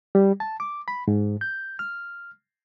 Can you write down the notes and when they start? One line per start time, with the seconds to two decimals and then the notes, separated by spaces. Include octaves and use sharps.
0.15 G3
0.40 A5
0.60 D6
0.88 B5
1.08 G#2
1.41 G6
1.79 F6